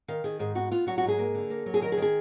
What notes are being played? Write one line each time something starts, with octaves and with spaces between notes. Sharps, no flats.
D#3 F5
D#3 G#4
G#2 G#4
B3 F#4
B3 F4
F#3 F#4
F#4
G#2 G#4
A#3
D3
A#3
F#3
G#4
D#3 A#4
G#4
D#3
G#4